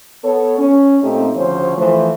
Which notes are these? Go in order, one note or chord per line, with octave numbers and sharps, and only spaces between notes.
B3 A4 C#5
C#4
A#2 A3 C4 D#4 G4 A4
D2 C#3 F3 C#4 C5 C#5
E3 F3 A3 C5